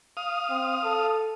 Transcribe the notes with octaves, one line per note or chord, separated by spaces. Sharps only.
F5 D#6
C4
A4